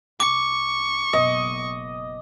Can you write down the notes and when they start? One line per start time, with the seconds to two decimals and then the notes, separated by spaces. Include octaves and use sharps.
0.20 C2 C#6 D6
1.13 F#1 B2 D#5